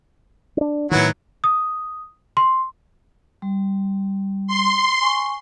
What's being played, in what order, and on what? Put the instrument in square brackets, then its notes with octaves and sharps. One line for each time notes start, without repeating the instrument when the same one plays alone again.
[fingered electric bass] C#4 D4
[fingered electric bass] A2 D#3 [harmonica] F#3 B3 E4
[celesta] D#6
C6
[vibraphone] G3
[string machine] C6
[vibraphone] G#5 C#6